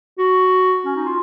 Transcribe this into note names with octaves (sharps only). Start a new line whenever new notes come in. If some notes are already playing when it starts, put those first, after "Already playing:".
F#4
C#4
D#4
F4